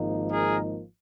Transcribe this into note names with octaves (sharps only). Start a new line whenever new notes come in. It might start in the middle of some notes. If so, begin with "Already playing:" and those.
Already playing: G#1 G#2 F3 A#3 D#4
G#4 A#4